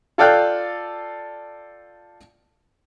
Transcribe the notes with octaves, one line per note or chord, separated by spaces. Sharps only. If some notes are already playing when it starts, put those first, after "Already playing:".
F4 A4 D5 F5 G5 F#6